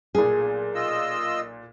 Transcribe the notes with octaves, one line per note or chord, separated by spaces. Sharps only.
B1 A#2 G#4
F4 D#5 E6